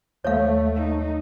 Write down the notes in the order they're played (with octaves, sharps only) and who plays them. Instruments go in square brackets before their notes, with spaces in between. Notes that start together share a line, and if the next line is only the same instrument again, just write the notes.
[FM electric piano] D#2 [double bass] A3 [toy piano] C#5 F5
[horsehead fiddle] D#4